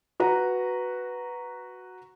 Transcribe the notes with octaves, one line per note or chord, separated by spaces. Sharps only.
F#4 B4 A#5